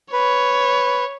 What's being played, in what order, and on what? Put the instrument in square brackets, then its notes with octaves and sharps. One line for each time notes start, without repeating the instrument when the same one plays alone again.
[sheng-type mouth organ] B4 [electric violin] C#5